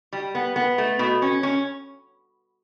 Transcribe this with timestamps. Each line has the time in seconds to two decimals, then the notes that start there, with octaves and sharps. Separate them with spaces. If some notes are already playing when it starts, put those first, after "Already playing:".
0.13 G3
0.35 B3
0.56 B3
0.78 A3
0.99 B2
1.22 C#4
1.43 C#4